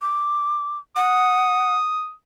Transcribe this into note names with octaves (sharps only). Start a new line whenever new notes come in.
D6
F#5 D#6